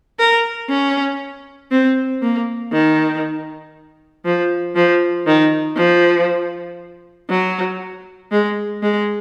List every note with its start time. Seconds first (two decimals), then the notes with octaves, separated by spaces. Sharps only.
0.19 A#4
0.70 C#4
1.71 C4
2.22 A#3
2.72 D#3
4.25 F3
4.76 F3
5.27 D#3
5.77 F3
7.30 F#3
8.32 G#3
8.82 G#3